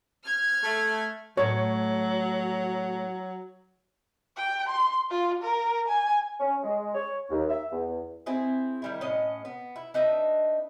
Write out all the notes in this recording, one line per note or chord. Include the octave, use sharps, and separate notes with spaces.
F6 G#6
A3
A2 F#3 A3 C#5
G5
C6
F4
A#4
G#5
C#4
G#3
C#5
D#2
E5
E2
C4 E4 G#4
D#3 G3 E4
A2 C#4 D#5
B3
E4
D4 D#4 B4 E5